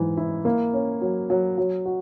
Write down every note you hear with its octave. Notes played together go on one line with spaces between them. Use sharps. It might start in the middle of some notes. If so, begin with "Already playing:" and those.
Already playing: G#2 E3
E4
A#3
C#4
F#3
F#3
F#3
F#4